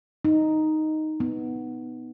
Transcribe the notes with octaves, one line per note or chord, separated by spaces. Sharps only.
D#4
B3